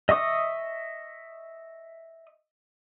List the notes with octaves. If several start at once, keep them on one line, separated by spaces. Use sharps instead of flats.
D#5 E5 C#6 D#6